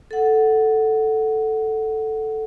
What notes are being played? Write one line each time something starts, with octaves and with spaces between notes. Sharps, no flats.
A4 F#5